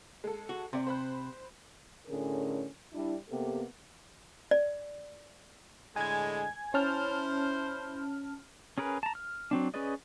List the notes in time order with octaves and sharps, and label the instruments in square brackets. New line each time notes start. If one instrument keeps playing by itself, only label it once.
[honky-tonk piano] G#3 A4
[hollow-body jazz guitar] F#4
[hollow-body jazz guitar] C3 [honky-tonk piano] D5 C6
[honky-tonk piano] C5 B5 F#6
[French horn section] A2 D3 C#4 G#4 A#4
G3 D4 E4
C3 A#3 B3 G4 A4
[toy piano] D5
[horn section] A2 D3 G#3 [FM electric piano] G#5 G#6
[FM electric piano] C#4 A5 F6 [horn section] E4 C5
[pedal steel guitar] C#4 G#4 A#4 B4
A5 A#5
F6
F#3 C4 D4
C#4 G#4 B4 D5 D#5